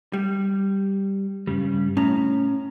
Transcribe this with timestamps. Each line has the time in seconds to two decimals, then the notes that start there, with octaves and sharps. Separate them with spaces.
0.13 G3
1.47 G2 C#3 G3
1.97 A2 C#4 A#5